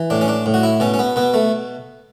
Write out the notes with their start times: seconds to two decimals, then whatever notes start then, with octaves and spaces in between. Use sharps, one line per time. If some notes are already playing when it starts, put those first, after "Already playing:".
Already playing: E3
0.10 A2 D4
0.21 C#4
0.28 D4
0.46 A2
0.54 F#4
0.63 E4
0.80 B2 C#4
0.94 C#4
0.99 B3
1.16 B2 B3
1.34 A3